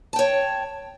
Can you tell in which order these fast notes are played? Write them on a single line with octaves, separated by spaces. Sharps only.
A5 G5 C#5